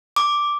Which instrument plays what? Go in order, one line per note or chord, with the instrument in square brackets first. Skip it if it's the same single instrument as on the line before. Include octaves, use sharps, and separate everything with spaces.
[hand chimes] D6